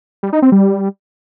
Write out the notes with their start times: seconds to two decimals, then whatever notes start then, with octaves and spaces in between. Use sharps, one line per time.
0.23 G3
0.33 D#4
0.42 C4
0.52 G3